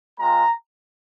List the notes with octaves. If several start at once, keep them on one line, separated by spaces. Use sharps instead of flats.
G#3 C4 F4 A#5